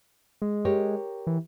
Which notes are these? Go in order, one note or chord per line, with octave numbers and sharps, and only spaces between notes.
G#3
G4 A#4 C#5
E3